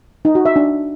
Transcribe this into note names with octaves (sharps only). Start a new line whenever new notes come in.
D#4
F#4
E5
D4